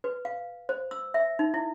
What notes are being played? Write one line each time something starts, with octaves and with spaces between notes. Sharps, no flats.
B4
F5
C5
E6
E5
D#4
E4